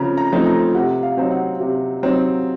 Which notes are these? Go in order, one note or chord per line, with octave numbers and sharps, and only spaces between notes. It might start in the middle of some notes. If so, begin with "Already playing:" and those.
Already playing: C#3 F3 A3 C4 A#5
A#5
F3 A3 C4 D#4
A#5
C3 F#5
F5
F#3 C4 D#4
F#5
C3
F#3 C4 D#4